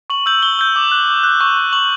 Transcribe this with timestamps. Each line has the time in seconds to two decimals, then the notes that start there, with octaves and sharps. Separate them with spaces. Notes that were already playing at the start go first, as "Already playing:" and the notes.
0.10 C#6 F#7
0.26 E6 G6 F#7
0.43 C#6 G7
0.59 E6 G6
0.76 D6
0.92 F#6
1.07 D6
1.23 F#6
1.41 C#6
1.56 F#6
1.73 C#6 F#7